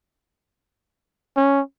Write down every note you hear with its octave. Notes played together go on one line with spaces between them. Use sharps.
C#4